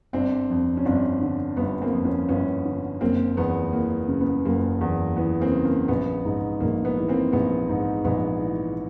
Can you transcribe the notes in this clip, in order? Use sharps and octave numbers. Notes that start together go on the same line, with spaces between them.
G1 C4 D4
F2
C#4
G1 C4 D4
D3
G1 B3
A#3 C4
F2
B3 C#4
G1 B3 C#4
D3
F#1 A#3 C4
E2 B3
E3 A#3
C#3
B3
F#1 A#3
E2
E3 B3
A#3 C4
C#3
A#3
A#1 B3
G#2
A#1 A#3
B3
E3
A#3 C4
A#1 B3
G#2
A#1 B3
E3